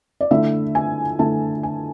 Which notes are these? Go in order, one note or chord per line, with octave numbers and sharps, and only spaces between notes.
D5
D3 A3 E4 E5
G#5
D3 A3 E4 A5
G#5